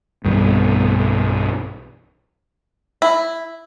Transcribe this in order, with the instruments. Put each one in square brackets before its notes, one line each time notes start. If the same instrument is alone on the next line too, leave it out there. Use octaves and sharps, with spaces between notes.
[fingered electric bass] B1 G2 B2 E3
[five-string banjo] E4